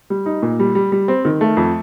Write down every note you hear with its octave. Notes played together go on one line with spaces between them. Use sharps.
G3
D#4
A#2
G3
G3
G3
C4
D#3
A3
F2